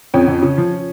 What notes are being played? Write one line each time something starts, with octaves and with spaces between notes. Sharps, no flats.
F2 C#4
F2
C#3
F3